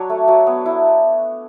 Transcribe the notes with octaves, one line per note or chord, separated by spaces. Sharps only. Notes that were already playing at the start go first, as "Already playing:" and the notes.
Already playing: F#3 D4 C#5
A3
F#3
B3
E4